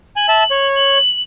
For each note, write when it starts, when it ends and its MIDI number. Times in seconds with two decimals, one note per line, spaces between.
0.16 0.26 80
0.16 0.67 102
0.29 0.43 76
0.29 0.43 81
0.51 0.98 73
0.75 1.22 102